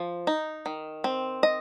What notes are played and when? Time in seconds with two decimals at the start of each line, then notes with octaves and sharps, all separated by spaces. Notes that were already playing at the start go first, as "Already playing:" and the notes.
Already playing: F3
0.27 D#4
0.66 D#3
1.04 C4
1.43 D#5